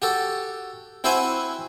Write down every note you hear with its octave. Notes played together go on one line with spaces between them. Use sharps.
F#4 G4 A4
C4 E4 F#4 C5 F#5 G#5